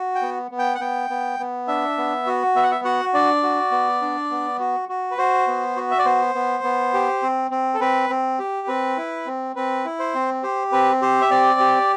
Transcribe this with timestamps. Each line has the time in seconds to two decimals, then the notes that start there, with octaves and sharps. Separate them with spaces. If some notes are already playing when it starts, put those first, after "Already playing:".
Already playing: F#4
0.15 G5
0.22 B3
0.51 B3
0.59 G5
0.75 F#5
0.80 B3 G5
1.10 B3
1.39 B3
1.68 D4 E5
1.97 B3
2.26 F#4
2.55 B3 E5
2.63 F#5
2.71 E5
2.85 F#4 F#5
3.14 D4 D5
3.43 F#4
3.72 B3
4.01 D4
4.31 B3
4.59 F#4
4.89 F#4
5.11 B4
5.18 F#4 C5
5.48 B3
5.76 F#4
5.91 E5
5.98 D5
6.05 B3 C5
6.35 B3
6.64 B3
6.93 G4
7.22 C4
7.51 C4
7.74 A4
7.80 C4 B4
8.10 C4
8.39 G4
8.67 C4 B4
8.97 E4
9.26 C4
9.56 C4 B4
9.85 E4
9.99 C5
10.14 C4
10.43 G4 C5
10.72 C4 B4
11.02 G4 C5
11.22 E5
11.31 C4 D5
11.60 G4